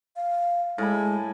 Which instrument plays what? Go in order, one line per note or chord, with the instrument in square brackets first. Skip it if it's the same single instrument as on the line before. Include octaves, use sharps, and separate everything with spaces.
[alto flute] F5
[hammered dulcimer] A2 G#5 B5 [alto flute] G#3